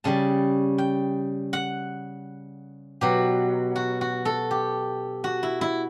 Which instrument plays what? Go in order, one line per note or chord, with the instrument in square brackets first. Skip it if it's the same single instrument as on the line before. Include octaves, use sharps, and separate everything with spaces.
[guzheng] C#3 G3 A5
G5
F#5
B2 F#3 G4
F#4
F#4
A4
G4
F#4
E4
E4